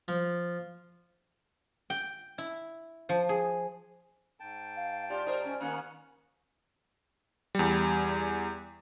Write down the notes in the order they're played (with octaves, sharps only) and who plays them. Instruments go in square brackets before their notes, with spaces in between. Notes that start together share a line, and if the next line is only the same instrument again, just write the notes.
[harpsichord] F3
[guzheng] G5
E4
F3
G#4
[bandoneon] G#2 G5 A5
[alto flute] F5
[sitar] F4 G4 [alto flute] D5
[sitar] D#4 A#4 C5
C#4
[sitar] D#3 A#3 C#4 [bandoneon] B3 F#5 F6
[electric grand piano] E2 G3